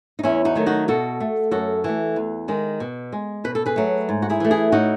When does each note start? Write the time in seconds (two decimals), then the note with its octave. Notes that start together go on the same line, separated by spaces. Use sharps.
0.19 D#4
0.23 E2 C#4 E4
0.45 D#4 F#4
0.55 D#3 F#3 A3
0.66 D#4 F#4
0.88 B2 F#4 A4
1.20 A3
1.51 F#2 F#4 A4
1.84 E3 A3
2.16 E2
2.48 D#3 G#3
2.80 B2
3.13 G#3
3.44 B2 B4
3.55 A4
3.66 G#4 B4
3.76 F#3 A3
4.09 G#2
4.22 F#4
4.30 E4 G#4
4.40 E3 A3
4.51 E4 G#4
4.72 A2 D#4 F#4